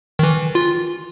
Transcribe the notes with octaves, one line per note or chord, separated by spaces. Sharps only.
D#3 E3
F4